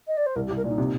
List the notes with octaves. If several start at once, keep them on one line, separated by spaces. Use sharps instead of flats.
D#5
D5
C5
C2 A#4
G4
C2
A#4
A#2 D#4
C3